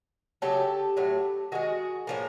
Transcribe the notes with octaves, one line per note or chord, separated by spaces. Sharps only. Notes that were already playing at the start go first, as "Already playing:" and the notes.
C#3 F#3 A3 G4 A4
A2 F#3 A3
D#3 G#3 F#4 G#4
A2 F3 A#3